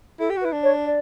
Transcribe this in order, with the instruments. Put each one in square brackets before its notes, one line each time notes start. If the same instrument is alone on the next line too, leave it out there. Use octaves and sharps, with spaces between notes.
[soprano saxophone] E4 [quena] A4
[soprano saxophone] G4
F#4
[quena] B4
[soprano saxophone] E4
D4
[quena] C#5
D5